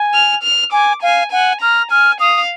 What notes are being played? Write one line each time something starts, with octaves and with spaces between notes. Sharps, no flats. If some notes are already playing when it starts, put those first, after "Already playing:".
Already playing: G#5
F6
F6
G#5 D6
F5 G#5
F#5 G#5
A#5 F6
G#5 F6
F5 D#6